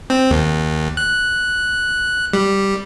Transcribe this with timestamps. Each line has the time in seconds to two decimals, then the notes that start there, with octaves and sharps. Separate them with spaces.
0.10 C4
0.31 D#2
0.97 F#6
2.33 G3